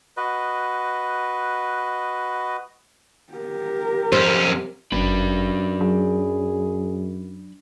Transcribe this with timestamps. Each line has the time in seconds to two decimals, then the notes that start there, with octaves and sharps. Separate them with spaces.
0.17 F#4 B4 D#5
3.33 G4 A#4
4.12 F2 C#4 C5
4.92 G1 F#2 D4 B4
5.81 F#3 G#4